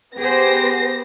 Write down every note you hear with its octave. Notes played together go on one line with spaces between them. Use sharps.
B3 G4 G#4 C5 A#6